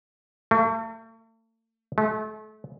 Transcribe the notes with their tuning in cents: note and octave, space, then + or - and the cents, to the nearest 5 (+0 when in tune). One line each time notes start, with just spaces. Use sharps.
A3 +40
A3 -35